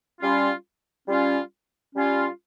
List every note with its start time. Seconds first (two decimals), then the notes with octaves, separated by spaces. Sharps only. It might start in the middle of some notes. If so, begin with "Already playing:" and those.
0.21 G3 C#4 F4
1.08 G3 C#4 F4
1.96 G3 C#4 F4